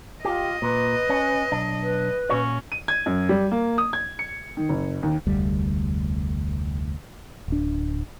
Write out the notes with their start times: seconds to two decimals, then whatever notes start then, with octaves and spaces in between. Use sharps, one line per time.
0.25 F4 G4 D#5
0.62 A#2 B4
1.10 C#4
1.52 B1 D4
1.82 B4
2.29 A#2 C#4 F#4 C#5
2.72 D#7
2.88 G#6
3.06 F#2
3.29 G3
3.51 A#3
3.78 D#6
3.93 G#6
4.19 C#7
4.57 D#3
4.69 F#1
5.03 D#2
5.27 F1 D2 G3
7.48 D1 D4